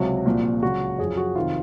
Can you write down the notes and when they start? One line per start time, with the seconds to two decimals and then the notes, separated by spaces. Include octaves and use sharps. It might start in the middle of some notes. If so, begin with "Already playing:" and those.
Already playing: C#2 C3 F#3 F#4
0.26 C2 A#2 F3
0.62 C#2 C#3 F#3 F#4
0.99 F#2 F3 G#4
1.17 F#4
1.35 F2 C3 D#3 F4